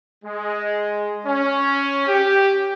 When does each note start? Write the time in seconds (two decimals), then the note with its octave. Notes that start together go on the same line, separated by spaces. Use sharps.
0.24 G#3
1.25 C#4
2.07 G4